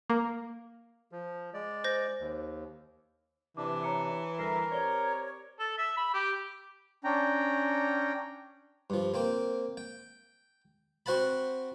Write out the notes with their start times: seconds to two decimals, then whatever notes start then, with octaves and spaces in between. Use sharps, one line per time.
0.10 A#3
1.12 F3
1.54 G#3 D5
1.84 C5 G6 A#6
2.20 D#2
3.57 C3 E3 D4 D6
3.83 C#5 A#5 C#7
4.39 D2 G3 A#4 E5 A#5 A#6 C7
4.72 C4 G4 C#5 D5 G7
5.60 A4
5.78 E5
5.97 B5
6.14 G4
7.04 C#4 D4 G5 A#5
8.90 G2 F3
9.14 A#3 C4 G5
9.77 G5
11.06 C4 F#4 C5 F#5 A5 B5